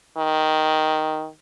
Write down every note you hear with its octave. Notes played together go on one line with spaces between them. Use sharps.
D#3